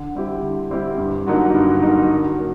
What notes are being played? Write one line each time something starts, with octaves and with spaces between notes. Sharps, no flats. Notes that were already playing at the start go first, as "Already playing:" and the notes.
Already playing: D3
G3 C4 E4 G4
D3
G3 C4 E4 G4
G2
D3 F#3 A#3 D#4
G2
D3 F#3 A#3 D#4
F#3
A#3 C#4 F#4